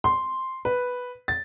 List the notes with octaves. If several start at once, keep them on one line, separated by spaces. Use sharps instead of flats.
C6
B4
A6